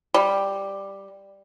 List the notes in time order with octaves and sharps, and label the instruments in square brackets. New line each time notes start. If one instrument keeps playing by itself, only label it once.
[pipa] G3